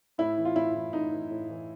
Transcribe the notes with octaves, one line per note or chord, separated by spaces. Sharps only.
A2 E4
E3
F4
A2 E4
E3
A2 D#4
E3
A2
E3